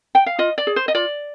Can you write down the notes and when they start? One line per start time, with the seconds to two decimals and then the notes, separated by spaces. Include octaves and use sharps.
0.15 G5
0.26 F5
0.39 F4 D#5
0.58 D5
0.67 G#4
0.76 C5
0.88 D#5
0.95 F4 D5